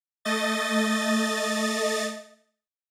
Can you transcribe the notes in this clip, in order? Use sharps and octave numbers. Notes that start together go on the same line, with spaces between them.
A3 D#5 A6